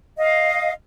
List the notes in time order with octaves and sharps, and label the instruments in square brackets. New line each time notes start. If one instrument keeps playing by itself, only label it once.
[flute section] D#5 F5